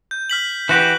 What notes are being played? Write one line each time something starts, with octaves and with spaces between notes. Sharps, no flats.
G6
F6 B6 F#7
E3 F#4 G4 F#6